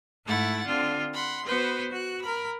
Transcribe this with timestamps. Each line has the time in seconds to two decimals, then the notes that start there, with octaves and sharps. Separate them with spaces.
0.25 G#2 A3 E4 F#5 A6
0.66 D3 C4 F4
1.13 F#5 B5 C6
1.45 B3 F#4 B4 C5
1.90 F#4 F#6
2.21 A#4 B5